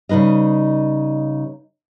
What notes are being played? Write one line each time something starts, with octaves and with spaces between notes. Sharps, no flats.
C#3 G3 D#4 B4 D#5